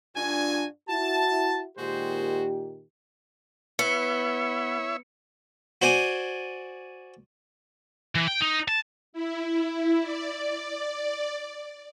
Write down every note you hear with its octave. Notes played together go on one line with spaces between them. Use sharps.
G2 D4 F4 F#4 G#5
E4 F#4 A5
A#2 D#3 G#3 F#4 G4 C5
B3 E4 C#5 E5 C#7
F#4 C5 D5 G#5
E3
G5
D#4
A5
E4
D5